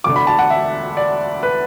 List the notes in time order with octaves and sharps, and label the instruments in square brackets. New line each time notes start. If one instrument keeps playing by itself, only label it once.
[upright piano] E1 D2 D3 D6
B5
A5
F#5
E5
D5
B4